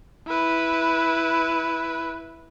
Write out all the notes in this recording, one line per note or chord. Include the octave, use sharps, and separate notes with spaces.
E4 B4